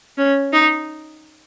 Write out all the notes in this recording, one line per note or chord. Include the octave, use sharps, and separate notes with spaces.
C#4
D#4